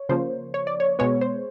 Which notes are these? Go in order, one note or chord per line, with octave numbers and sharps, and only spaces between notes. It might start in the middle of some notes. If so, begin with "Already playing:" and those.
Already playing: C#5
C#3 F3 A#3 C5
C#5
D5
C#5
B2 G#3 B3 C#5
C5